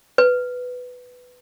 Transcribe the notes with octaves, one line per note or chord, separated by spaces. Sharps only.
B4